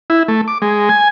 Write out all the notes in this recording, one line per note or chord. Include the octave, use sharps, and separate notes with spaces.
E4
A3
D6
G#3
G#5